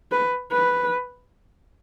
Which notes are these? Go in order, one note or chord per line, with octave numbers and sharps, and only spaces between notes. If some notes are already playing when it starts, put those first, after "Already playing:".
B4
B4